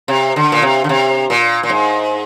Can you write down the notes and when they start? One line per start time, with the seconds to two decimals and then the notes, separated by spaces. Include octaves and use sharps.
0.08 C3
0.36 D3
0.52 A#2
0.62 C3
0.84 D3
0.89 C3
1.30 A#2
1.63 A#2
1.70 G#2